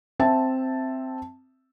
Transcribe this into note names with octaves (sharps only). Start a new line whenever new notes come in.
C4 E5 A5